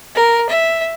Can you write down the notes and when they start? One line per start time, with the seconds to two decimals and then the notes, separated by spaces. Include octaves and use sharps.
0.15 A#4
0.49 E5